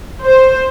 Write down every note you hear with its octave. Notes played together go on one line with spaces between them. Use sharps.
C5